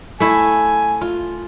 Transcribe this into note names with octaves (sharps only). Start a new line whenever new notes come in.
A3 E4 G#5
F4